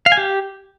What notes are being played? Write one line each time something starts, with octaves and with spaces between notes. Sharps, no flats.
F5
G#5
G4